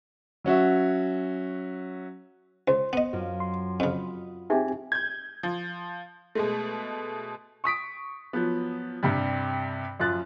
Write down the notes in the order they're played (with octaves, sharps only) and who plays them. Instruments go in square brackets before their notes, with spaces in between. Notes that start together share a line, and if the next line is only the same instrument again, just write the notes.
[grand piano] F#3 C#4 F#4 E5
[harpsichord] C#2 [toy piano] C5 [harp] C6
[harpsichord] B3 D#5
[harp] F#2 F4
[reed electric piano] C6
[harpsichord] F2 C#3 [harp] B5 D#6 F6
[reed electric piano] C4 G4 G#5 [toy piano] D#4 G#4 E5
[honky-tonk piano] G6 G#6
F3
B2 G#3 A3
[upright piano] C#6 D#6 B6 D7
F3 F#3 B3
G2 C3 G3
F#2 F3 F4 F#6 A6